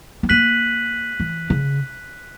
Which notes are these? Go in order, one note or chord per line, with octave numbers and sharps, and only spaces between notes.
B3
A#3 F#6 B6 D#7 F#7
E3
C#3